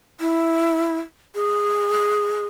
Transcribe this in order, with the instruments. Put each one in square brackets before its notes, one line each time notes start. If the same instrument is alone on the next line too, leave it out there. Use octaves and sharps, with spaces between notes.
[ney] E4
G#4